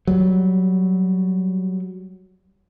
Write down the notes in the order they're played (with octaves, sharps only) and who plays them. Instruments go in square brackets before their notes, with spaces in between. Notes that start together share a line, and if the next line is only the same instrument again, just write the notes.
[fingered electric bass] F#3 G3